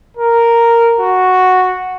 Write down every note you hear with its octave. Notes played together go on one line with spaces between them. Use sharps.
A#4
F#4